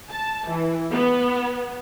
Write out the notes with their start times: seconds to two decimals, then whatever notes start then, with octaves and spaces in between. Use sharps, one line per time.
0.11 A5
0.48 E3
0.91 B3